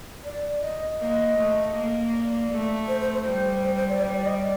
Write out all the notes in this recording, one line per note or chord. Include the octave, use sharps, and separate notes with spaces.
D5
D#5
A#3 D#5
A3
A#3
D5
A3
C5
C5
C5
G3
C5
C5
D5
G3 C5
D5
D#5
D5